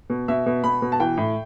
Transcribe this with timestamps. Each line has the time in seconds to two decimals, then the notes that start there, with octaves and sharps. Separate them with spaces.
0.10 B2
0.28 B2 E5
0.46 B2
0.64 B2 B5
0.82 B2
0.92 A5
1.00 E3 G5
1.17 A2